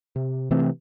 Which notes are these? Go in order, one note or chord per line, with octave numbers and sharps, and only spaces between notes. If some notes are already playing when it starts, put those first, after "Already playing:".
C3
C3 E3 A3 C4